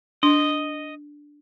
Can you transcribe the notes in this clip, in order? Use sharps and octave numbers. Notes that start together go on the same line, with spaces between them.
D4 D#5